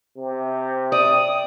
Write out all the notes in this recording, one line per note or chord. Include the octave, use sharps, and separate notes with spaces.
C3
D5 D#6